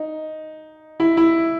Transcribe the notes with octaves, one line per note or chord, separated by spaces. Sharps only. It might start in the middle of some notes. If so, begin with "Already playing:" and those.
Already playing: D#4
E4
E4